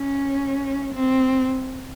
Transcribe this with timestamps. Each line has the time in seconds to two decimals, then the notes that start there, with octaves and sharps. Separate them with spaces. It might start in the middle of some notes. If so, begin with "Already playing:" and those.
Already playing: C#4
0.94 C4